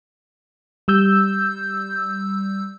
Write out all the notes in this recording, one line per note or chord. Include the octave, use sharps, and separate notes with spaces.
G3 E6 G6